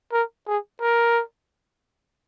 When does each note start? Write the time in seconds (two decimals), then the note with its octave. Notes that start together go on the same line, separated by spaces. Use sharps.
0.12 A#4
0.47 G#4
0.81 A#4